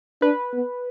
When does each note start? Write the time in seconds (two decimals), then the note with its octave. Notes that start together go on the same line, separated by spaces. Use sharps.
0.22 D4 B4
0.53 B3